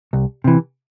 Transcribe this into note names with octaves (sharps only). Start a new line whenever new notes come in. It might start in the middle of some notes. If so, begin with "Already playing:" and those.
C2
C3 E3